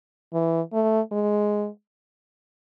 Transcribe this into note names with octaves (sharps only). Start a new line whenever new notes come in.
E3
A3
G#3